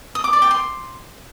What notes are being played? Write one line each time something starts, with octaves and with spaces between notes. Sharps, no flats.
D#6
D6
D5
G5
C6